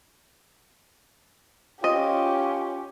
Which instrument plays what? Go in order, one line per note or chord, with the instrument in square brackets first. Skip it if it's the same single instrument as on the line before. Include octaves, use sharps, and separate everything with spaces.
[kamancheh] C#4 G4 [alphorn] F4 [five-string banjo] D#5